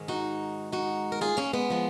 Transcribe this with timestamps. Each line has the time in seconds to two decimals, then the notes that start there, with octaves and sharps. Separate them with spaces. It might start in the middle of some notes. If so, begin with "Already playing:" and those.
Already playing: G#2 D#3 G#3
0.08 D#4 F#4
0.72 D#4 F#4
1.12 A#4
1.21 F4 G#4
1.37 A#3 C#4
1.53 G#3 B3
1.70 F3 G#3